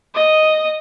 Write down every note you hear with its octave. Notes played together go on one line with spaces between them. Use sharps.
D#5